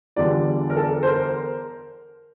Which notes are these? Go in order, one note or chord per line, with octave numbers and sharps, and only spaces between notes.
E2 D3 G3 D4 F4 D5
A#4
A4
C5
A#4